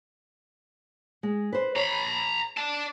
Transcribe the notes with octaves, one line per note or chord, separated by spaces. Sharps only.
G#3
B4 C5
C#5 A#5 B5
D5 A5